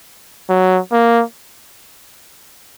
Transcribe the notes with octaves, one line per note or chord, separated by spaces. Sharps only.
F#3
A#3